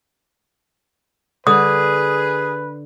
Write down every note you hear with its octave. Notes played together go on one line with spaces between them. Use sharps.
D3 G#4 B4 D#6